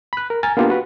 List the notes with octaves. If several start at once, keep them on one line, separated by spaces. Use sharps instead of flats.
B5 F#6
A#4
G#5 A#5 F6 A6
A#3 B3 D4 F4 G4 D5
F#4 B4